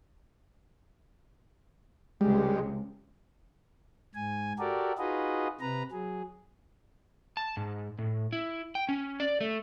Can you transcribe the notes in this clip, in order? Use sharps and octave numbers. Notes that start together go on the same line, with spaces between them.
C#2 C3 G3 G#3
G#2 G#5
F#4 G4 A4 A#4 D5
D#4 F4 F#4 G#4 B4 D#5
C3 B4 A#5
F#3 G#4
A5
G#2
A2
E4
G5
C#4
D5
A3